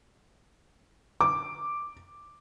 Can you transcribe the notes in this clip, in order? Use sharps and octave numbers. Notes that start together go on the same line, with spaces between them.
D6